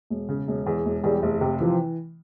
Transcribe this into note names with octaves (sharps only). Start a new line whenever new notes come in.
E1
C#3
E1
E2
E1
E2 G3
F1
C3
E3 F3